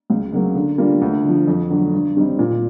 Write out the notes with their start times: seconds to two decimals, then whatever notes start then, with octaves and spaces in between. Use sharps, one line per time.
0.10 C#2
0.32 C#3 F#3 A#3
0.55 D3
0.78 G3 A#3 D4 F4
1.01 D2
1.24 D3 F3
1.48 F2
1.70 D3 F#3
1.93 G2
2.16 D#3 G3 C4 D#4
2.39 A#2